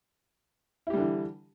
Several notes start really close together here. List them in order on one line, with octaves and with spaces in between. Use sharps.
E4 G4 G3 D3 E3